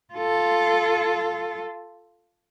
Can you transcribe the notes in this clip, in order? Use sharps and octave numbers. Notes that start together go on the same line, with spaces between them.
F4 A4